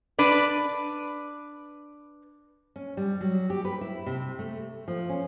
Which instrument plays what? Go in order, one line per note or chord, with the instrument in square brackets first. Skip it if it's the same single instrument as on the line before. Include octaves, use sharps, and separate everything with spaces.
[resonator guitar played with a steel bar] D4 B4 D5
[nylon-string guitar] C#4
G3
F#3
G4
B4
E4
C3
A3
F3
C#4